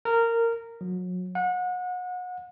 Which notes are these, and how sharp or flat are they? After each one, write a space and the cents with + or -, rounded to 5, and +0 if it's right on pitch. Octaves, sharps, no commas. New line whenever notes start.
A#4 -15
F#3 -30
F#5 -30